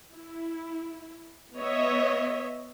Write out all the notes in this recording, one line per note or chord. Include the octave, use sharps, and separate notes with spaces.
E4
B3 C#5 D#5 E5